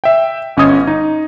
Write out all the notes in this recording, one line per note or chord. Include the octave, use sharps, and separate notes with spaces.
E5 G5
G1 C#4 D#5 D#6 G#6
D#4